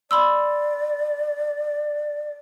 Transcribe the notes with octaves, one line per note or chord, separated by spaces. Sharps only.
D5 B5 C6 E6